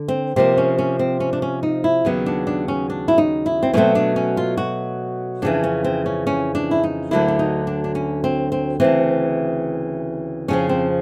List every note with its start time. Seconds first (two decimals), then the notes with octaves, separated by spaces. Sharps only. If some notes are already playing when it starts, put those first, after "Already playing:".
Already playing: D3
0.08 C4
0.36 C3 F3 A#3 C4
0.57 C#4
0.78 C#4
0.99 C4
1.20 C#4
1.33 D4
1.42 C#4
1.63 D#4
1.84 E4
2.05 D#2 C#3 F#3 B3 D#4
2.26 D4
2.47 D4
2.68 C#4
2.90 D4
3.08 E4
3.18 D#4
3.46 E4
3.63 C4
3.73 B2 F#3 A3 C4 C#4
3.95 D4
4.16 C#4
4.37 F4
4.57 F#4
5.42 F2 C#3 E3 D4
5.64 C#4
5.84 C4
6.06 C#4
6.27 C#4
6.55 D4
6.71 E4
6.84 D#4
7.11 D2 D3 F#3 A#3 E4
7.28 D4
7.39 D#4
7.67 D4
7.84 D4
7.95 C#4
8.24 C4
8.52 C4
8.80 D2 C#3 E3 C4
10.48 F2 C#3 F3 C#4
10.69 C4